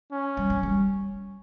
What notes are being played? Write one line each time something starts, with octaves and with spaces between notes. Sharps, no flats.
C#4
G3
F#3
G3